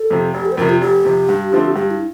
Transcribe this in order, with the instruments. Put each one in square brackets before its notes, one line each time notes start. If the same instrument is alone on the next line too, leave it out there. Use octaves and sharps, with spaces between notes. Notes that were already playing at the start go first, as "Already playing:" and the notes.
Already playing: [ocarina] A4
[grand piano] F2 C3
[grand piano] F1 [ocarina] G4
[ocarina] A4
C5
[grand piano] F2 C3 [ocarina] A#4
[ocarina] F4
[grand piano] F1 [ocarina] G4
[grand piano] F2 C3
G2
D3 F3 A3 C4
[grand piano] G2 [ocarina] G4
[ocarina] E4